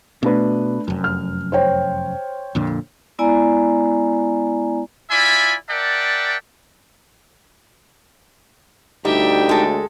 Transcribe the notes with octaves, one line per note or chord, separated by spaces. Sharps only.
B2 A3 D4 B4
F1 F#2
F6
C5 C#5 G5
F2 A#2 D3
G#3 B3 E4 D5 G#5 A#5
E4 F4 D5 E5 G#5 B5
A#4 D5 E5 F#5 G5 A5
D2 G3 D#4 G4 E5 G5
G#3 A4